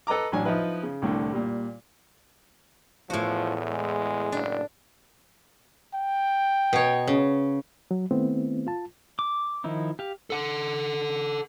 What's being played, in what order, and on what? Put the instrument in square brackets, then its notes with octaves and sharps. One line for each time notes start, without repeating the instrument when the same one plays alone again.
[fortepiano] A4 B4 D#5 A#5 D6
A1 F#3 D4 G#5
F3 D#4 E4 B4
C#3
C2 A2 D3
A#2 G3
[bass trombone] E2 [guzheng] A2 F#4 [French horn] F3
[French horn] G#3
[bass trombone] F#1 [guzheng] D4
[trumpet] G5
[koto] B2 C#5
C#3
[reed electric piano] F#3
D#3 A3 B3 C4 E4
F4 A5
[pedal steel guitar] D6
D#3 F3 D#4 E4
G4 F5
[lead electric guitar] A4 F#5